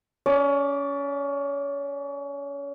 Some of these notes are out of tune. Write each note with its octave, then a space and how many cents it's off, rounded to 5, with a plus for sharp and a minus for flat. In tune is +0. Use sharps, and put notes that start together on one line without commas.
C#4 +25 D5 +0